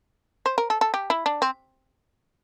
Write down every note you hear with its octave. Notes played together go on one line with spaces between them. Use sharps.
C5
A#4
A4
A4
G4
E4
D4
C4